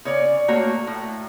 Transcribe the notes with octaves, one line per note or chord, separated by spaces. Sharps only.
C#3 C#5 D5
A3 A#3 F#4 C#5
A2